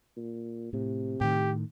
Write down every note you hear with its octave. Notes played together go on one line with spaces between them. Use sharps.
A#2
A2 C3
A2 D#3 G4